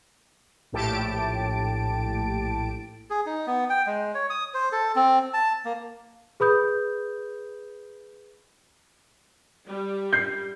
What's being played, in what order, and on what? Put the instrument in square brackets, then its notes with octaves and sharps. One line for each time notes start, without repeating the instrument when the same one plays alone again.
[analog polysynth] A#1 A2 G4 A5 D7
[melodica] G#4
D#4
B3
G5
G#3
C#5
D#6
C5
A4
C4
A5
A#3
[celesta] G#4 B4 B5 D#6 G6
[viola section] G3
[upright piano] G6 C7